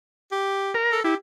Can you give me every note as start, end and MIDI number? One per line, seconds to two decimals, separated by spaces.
0.32 0.74 67
0.74 1.00 70
0.92 1.01 69
1.04 1.15 64
1.04 1.16 67